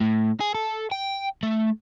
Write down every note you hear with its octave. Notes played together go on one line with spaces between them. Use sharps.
A2
G#4
A4
G5
A3